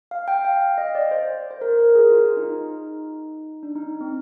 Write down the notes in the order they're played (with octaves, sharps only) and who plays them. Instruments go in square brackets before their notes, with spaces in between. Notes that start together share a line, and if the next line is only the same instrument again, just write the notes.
[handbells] F5
G5
F5
F5
D#5
D5
C5
C5
A#4
A#4
G#4
F4
D#4
D4
D#4
C4